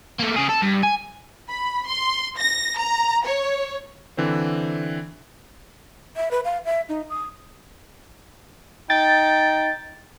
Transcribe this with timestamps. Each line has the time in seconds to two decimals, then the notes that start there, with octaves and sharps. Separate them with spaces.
0.19 A3 A#3
0.36 C#3 G#4
0.49 A4
0.62 G2
0.83 G#5
1.49 B5
1.86 C6
2.38 A#6
2.77 A#5
3.26 C#5
4.17 D3 E3 C4 C5
6.16 E5
6.31 B4
6.45 F5
6.65 E5
6.89 D#4
7.10 D#6
8.90 D#4 G5 A6